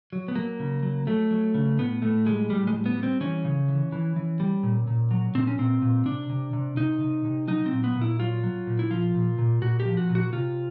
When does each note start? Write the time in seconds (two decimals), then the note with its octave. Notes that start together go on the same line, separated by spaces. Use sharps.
0.13 F#3
0.28 B3
0.35 F#3 A#3
0.60 C#3
0.83 F#3
1.07 F#3 A3
1.31 F#3
1.54 C#3
1.78 A2 B3
2.02 A2 A3
2.26 G3 G#3
2.50 A2 G3
2.67 G#3
2.74 G3
2.86 B3
2.97 G3
3.03 C4
3.21 E3 C#4
3.45 C#3
3.68 E3
3.92 E3
4.16 E3
4.40 G3
4.63 A#2
4.87 A#2
5.11 F#3
5.35 A#2 C4
5.47 C#4
5.58 A#2 C4
5.82 A#2
6.06 C3 D4
6.30 C3
6.53 C3
6.77 C3 D#4
7.01 C3
7.25 C3
7.48 F#3 D#4
7.66 C4
7.72 A#2
7.84 B3
7.96 A#2
8.01 E4
8.19 F#3 F4
8.43 F#3
8.67 A#2
8.79 E4
8.91 F3 F4
9.15 A#2
9.38 A#2
9.62 A#2 F#4
9.80 G4
9.85 F3
9.97 F#4
10.09 A#2
10.15 F#4
10.33 C3 F4